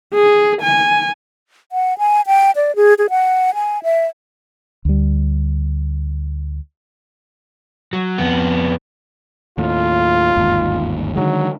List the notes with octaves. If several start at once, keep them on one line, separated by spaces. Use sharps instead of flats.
G#4
G#5
F#5
G#5
G5
D5
G#4
G#4
F#5
G#5
E5
D2 G3
F#3
F2 B3
D#2 A2 F4
G1 D#2 G#2
D3 D#3 F#3 G#3